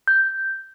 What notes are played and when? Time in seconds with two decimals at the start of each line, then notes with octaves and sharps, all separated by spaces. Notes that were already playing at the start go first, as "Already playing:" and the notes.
0.08 G6